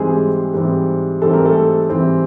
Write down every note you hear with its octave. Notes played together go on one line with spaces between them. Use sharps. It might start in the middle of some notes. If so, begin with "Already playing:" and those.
Already playing: G#2 E3 G3 G#3 C4 G#4
G#2 E3 G3 C4
G#2 E3 G3 C4 A4
A#4
A3 A4
G#2 E3 G3 C4